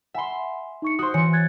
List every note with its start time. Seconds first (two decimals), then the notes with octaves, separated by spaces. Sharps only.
0.14 E5 F#5 G#5 B5 C6
0.82 D#4 C#6 C#7
0.99 F#4 C5 C6 D#6
1.14 E3 C#5 G#5 C#7
1.33 F#6 G#6 A6